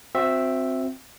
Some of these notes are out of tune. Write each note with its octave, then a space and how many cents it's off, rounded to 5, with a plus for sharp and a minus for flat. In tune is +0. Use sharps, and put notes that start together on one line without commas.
C4 +0 F#4 -40 E5 +0